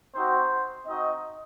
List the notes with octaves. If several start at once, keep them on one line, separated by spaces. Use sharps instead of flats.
C4 D#4 F#4 C5
C4 D#4 F#4 D#5